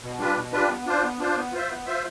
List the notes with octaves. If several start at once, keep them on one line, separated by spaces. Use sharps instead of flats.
B2
G3 D4 F4 B4
B2
G3 D4 F4 B4
B3
D4 F4 C5
B3
D4 F4 C5
B3
F4 C5 E5
B3
F4 C5 E5